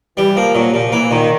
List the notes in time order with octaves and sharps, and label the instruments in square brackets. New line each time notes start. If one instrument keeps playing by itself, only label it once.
[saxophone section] E3 [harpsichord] G3
[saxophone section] F3 [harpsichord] A#3
[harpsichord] A#2 [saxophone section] F#3
[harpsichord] A#2 [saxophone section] F3
[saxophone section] E3 [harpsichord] A#3
[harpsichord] A#2 [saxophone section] D#3